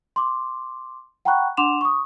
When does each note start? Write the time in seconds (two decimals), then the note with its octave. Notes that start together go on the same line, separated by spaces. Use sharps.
0.16 C6 D6
1.25 F#5 G5 A#5 B5 C#6 F#6
1.57 D4 F#5 C6 D6 E7 F7
1.81 C#6 D#6